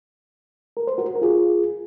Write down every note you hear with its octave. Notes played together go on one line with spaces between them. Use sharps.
A#4
C5
F#4 A#4
A#4
F4 G#4